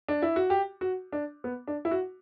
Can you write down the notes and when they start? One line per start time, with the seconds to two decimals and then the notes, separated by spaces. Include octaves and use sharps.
0.08 D4
0.22 E4
0.36 F#4
0.50 G4
0.81 F#4
1.12 D4
1.44 B3
1.67 D4
1.85 E4
1.91 F#4